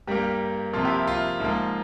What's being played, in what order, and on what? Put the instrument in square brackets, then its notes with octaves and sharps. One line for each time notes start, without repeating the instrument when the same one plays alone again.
[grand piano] G2 G3 A#3 G4 A#4
C3 F3 A#3 F4
E4 G4
F4
G#2 F3 A#3